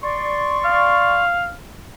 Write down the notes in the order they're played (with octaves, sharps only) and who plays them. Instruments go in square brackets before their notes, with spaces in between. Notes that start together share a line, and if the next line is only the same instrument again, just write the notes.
[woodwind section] D5 C6 C#6
[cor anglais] F5